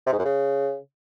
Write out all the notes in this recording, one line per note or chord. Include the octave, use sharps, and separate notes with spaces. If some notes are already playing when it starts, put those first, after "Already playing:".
C3
G#2
F#2
C#3